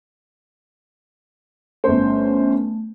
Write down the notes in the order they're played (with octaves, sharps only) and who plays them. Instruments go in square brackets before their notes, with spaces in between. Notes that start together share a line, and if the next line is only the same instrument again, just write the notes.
[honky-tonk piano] G1 C5 [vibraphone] A3 [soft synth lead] C#4